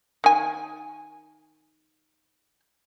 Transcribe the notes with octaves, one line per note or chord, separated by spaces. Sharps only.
D#3 G#5